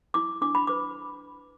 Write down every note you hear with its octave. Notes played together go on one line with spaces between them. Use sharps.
E4 D6
D4 D6
B5
B4 D6